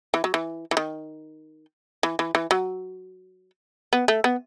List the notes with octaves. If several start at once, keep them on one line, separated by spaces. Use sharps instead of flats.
E3
F#3
E3
E3
D#3
E3
E3
E3
F#3
B3
A3
B3